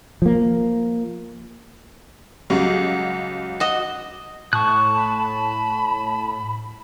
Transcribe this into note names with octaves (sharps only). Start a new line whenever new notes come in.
F3 A#3
C#2 F#3 G3
F#4 D#5
A2 A5 C#6 D#6 F#6
B5